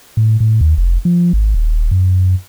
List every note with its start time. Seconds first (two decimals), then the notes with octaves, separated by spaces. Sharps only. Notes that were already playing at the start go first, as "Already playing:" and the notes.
0.17 A2
0.40 A2
0.61 D#2
0.77 F1
1.05 F3
1.33 G#1
1.54 D#1
1.91 F#2